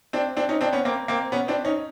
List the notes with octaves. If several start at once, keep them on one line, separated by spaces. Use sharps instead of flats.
C4 D4
C4 D4
C#4 D#4
C4 D4
B3 C#4
A#3 C4
A#3 C4
B3 C#4
C4 D4
C#4 D#4